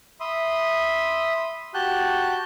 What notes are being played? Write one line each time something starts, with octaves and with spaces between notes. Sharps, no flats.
E5 B5 C6 D#6
F#4 G4 A5 F#6 G6